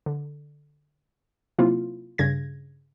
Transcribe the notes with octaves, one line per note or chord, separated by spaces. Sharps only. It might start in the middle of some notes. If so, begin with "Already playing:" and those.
D3
C3 F#3 A#3 C4 E4 F4
G2 C#3 G#6 A#6